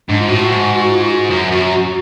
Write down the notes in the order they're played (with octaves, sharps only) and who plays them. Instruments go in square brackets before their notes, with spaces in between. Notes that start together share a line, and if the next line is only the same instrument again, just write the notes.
[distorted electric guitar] G#2 [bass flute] D4
[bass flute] F4
[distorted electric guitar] A2 [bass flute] F#4
[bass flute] F#4
[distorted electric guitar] G#2
[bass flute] F4
F#4
[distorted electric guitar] F#2
F#2